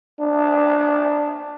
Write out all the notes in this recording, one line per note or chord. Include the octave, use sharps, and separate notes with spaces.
D4